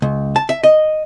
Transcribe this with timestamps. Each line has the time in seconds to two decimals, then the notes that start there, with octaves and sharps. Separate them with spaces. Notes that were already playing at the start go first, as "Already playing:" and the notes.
0.02 C#2
0.36 A5
0.49 E5
0.63 D#5